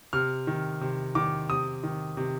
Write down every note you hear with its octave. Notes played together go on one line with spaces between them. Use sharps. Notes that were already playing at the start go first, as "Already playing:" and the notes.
C3 F6
D#3
C3
D#3 D6
C3 D#6
D#3
C3